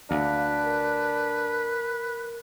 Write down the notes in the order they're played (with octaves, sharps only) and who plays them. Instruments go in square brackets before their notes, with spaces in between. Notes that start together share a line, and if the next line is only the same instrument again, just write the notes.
[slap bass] D2 [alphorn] D4 [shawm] B4 [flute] F5
[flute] A#4